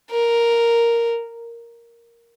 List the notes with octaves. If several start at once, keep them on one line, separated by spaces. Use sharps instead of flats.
A#4